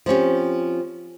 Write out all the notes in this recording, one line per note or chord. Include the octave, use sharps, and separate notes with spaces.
F3 C4 C#4 G4